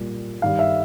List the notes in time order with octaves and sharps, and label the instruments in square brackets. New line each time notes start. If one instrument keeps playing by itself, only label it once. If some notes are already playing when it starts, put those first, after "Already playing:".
Already playing: [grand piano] A#2 G3
G2 D#3 G3 F5
E5